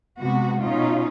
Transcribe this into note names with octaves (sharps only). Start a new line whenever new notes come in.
C3 G#3 B3 F#4
B2 C#4 D#4 F4